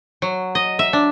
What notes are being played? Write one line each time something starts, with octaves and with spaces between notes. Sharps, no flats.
F#3
D#5
E5
D4